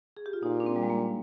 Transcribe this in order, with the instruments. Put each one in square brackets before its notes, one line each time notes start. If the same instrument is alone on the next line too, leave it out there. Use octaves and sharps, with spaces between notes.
[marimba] G#4
G4
F4
[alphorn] A#2 [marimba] D#4
[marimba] D4
C4
G3
G#3
A#3